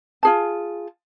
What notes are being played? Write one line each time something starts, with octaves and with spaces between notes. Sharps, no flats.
F4 G#4 A5